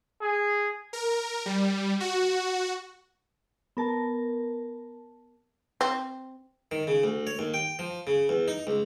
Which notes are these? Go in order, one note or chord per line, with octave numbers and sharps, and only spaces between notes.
G#4
A#4
G3
F#4
B3 A#4 A5
C4
D#3
C#3
D2
C#5
D#2
G5
F3
C#3
E2
D#4
C#2